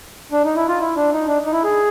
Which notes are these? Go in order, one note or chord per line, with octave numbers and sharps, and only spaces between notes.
D4
D#4
E4
F4
E4
D4
D#4
D4
D#4
E4
G#4